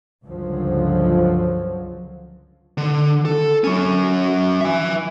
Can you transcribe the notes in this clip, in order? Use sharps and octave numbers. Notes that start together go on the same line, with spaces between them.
C#2 G2 D3 F3 F#3
D3
A4
F#3 C#4
E5 G#5